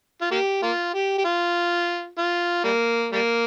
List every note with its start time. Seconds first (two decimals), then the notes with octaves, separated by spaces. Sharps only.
0.21 F4
0.31 A#3 G4
0.63 A#3 F4
0.94 G4
1.18 G4
1.25 F4
2.18 F4
2.64 G3 A#3
3.12 G3 A#3